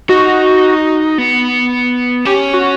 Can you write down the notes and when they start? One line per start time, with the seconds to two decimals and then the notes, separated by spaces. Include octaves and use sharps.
0.09 D#4 F#4
1.18 B3
2.25 C#4 G4
2.53 F#4